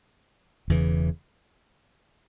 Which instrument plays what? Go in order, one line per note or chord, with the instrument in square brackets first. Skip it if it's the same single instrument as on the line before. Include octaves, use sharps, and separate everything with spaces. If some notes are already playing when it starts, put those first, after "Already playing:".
[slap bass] E1 E2 C#3 E3